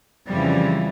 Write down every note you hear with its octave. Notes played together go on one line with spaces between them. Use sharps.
F2 C#3 E3 F3 G3